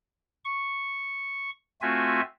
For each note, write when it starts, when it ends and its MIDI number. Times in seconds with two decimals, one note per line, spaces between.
0.44 1.50 85
1.82 2.21 57
1.82 2.21 60
1.82 2.21 65
1.82 2.21 66
1.82 2.21 76
1.82 2.21 80